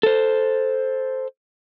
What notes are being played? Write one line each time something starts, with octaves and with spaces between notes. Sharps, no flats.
A4 C5